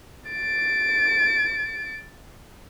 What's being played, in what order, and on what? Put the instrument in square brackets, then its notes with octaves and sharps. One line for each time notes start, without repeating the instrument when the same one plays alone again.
[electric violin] A6 D7